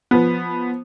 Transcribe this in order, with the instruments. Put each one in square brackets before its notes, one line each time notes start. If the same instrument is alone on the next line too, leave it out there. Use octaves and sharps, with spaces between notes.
[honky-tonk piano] F3 B3